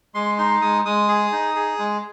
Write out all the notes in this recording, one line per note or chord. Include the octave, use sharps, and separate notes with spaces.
G#3 C6
D#4 C6
G#3 D#6
G#3 D#6
G#4
D#4
G#4
G#3